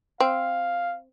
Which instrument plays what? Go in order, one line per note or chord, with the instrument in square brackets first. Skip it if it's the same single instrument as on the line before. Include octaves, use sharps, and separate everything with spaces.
[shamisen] C4 [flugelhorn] F5